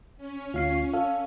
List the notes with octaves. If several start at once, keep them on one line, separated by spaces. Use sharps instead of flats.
C#4
D2 F4 F5 C7
A4 F5